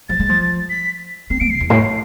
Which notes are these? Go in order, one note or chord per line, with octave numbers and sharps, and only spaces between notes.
F3 A6
G#3
F3
B6
C4 C7
B3 D7
C3 C7
E2
A2